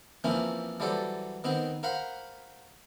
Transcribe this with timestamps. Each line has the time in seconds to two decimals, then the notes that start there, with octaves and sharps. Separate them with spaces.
0.24 E3 F3 A#3 C4 C#4 E4
0.80 E3 F#3 G3 A4 C5 D5
1.44 D#3 B3 C4 C5
1.83 A#4 C5 F5 F#5 B5